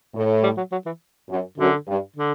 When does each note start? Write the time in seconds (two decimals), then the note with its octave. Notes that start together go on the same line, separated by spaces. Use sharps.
0.15 A2
0.44 G3
0.57 F#3
0.72 F#3
0.86 E3
1.29 F#2
1.58 F#2 D3
1.87 G2
2.16 D3